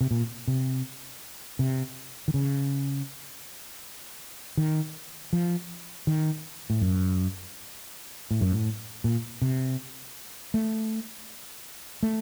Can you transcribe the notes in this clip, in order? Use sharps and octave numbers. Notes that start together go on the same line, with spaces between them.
C3
A#2
C3
C3
D#3
C#3
D#3
F3
D#3
A2
F#2
A2
F#2
A2
A#2
C3
A3
A3